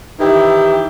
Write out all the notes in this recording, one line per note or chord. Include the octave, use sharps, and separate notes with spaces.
D#3 E3 E4 G4